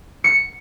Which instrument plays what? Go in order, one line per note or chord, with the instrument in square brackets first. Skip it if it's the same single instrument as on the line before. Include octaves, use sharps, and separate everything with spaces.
[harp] C#7